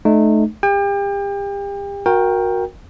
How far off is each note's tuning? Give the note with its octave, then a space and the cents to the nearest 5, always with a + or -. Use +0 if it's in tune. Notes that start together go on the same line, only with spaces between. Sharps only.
A3 -25 D#4 -30
G4 +35 G5 +35
F#4 -20 A#4 +10 G5 +10